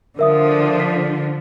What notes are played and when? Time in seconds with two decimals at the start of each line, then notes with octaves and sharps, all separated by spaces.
0.19 D3 F3 A#4 E5 D#6
0.80 B6